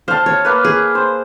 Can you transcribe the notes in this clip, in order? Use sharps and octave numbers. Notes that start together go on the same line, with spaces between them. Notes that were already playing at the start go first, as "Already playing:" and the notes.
C5 F5 A5
C#5
A#3 B4
G#4
C5